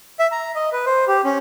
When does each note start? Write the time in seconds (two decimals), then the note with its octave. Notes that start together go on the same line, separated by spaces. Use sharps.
0.19 E5
0.32 A#5
0.55 D#5
0.73 B4
0.86 C5
1.08 G4
1.25 C#4